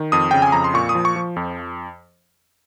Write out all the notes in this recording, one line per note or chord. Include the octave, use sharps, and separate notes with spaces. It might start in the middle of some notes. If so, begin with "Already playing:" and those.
Already playing: D#3
F2 D#6
C#3 G5
G#5
F2 A#5
C6
A#2 C#6
D#6
F3
C#6
F3
F2